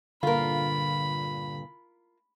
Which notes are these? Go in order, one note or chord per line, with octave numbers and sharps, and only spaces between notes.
G2 A#2 D3 F4 A#4 B5